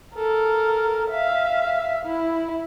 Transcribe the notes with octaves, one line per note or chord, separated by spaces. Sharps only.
A4 A#4
E5 F5
E4